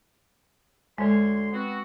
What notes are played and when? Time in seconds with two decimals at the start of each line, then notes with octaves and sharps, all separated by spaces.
0.98 D2 G#3 C#5 C6
1.53 B3 C4 F#4